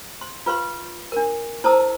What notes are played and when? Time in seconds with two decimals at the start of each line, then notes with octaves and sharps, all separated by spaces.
0.21 C6
0.46 F4 B4 F5 C6
1.12 D4 A#4
1.64 E4 C5 A5 A#5 D#6 E6